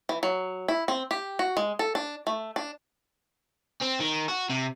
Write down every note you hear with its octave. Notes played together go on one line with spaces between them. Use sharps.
E3
F#3
E4
C4
G4
F#4
G#3
A4
D4
A3
D4
C4
D#3
F#4
C3